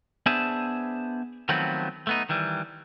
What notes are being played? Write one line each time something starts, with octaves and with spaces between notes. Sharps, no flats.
B3 D4 G#4 C5 E5 A5
D#3 F3 F#3 A3 B3 C4
A3 B3 D#4
D#3 E3 G3